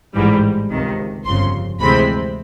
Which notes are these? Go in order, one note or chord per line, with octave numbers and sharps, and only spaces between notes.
A1 G#2 E3 G3
C#2 C3 D#3
G1 F2 C#3 C6
D2 C3 E3 G#3 C4 B5